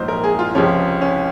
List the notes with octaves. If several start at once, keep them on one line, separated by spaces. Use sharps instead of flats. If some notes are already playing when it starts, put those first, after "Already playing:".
Already playing: A#1 G#2 F#3 C5 D#5
A#4
G#4
F4
C#2 C3 F3 G#3 C#4
C#4